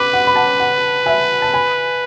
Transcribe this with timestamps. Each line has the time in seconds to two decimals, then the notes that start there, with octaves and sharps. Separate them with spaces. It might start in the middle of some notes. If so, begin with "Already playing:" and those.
Already playing: B4 B5 D6
0.13 F#5
0.27 B5
0.36 F#5 A5
0.60 F#5
1.06 E5 G#5
1.42 A5
1.54 G#5 B5